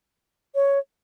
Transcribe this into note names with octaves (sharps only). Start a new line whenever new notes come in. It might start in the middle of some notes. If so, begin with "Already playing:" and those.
C#5